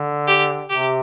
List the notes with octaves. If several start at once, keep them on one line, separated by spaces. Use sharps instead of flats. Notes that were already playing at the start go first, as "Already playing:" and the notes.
Already playing: D3
G4
C3 G4